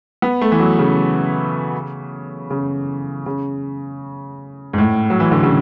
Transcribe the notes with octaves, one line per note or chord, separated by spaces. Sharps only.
B3
A3
E3
F#3
C#3
C#3
C#3
G#2
A2
F#3
E3
D3
C#3